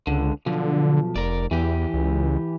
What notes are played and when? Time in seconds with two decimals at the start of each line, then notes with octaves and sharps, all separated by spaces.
0.07 C#2 D3
0.46 B1 D3 F3
1.16 F1 A#4 D5
1.51 E2 E3 G4
1.94 C#2